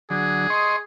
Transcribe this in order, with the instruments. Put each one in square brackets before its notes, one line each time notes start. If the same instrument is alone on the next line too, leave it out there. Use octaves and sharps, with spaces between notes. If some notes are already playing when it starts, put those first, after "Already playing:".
[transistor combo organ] D3 F#3 [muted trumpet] G#4
[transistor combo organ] D#5 C6 C#6